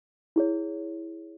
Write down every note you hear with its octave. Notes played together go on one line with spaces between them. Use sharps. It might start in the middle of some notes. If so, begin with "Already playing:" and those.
E4 G#4 C#5